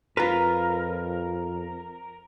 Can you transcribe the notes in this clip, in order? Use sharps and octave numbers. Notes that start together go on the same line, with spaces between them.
F2 F4 A#4 B4